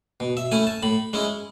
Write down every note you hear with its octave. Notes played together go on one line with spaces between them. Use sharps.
B2
E5
A3 C#4 E4 G#5
A5
A2 B5
G#3 C#4 E4